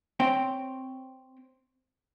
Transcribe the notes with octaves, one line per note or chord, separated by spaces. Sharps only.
C4 C#5 G5